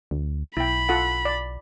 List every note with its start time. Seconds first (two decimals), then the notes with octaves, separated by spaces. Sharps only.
0.11 D2
0.57 B1 E4 G5 B5
0.89 F4 A4 F#5
1.25 D5